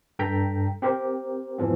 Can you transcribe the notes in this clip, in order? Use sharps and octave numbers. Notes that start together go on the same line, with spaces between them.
G2 A4 G5 A#5 G6 B6
C4 G4 A#4 C5
F2 G#2 E3 F3 B3